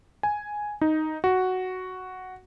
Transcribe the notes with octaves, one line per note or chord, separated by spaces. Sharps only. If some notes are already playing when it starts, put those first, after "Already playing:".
G#5
D#4
F#4